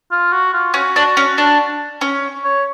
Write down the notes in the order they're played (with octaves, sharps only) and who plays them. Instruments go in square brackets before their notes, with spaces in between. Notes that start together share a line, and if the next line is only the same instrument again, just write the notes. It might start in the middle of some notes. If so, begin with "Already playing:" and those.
[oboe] F4
F#4
F4
[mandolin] C#4 [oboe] F#4
[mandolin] D4
C#4
D4
C#4
[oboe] C#5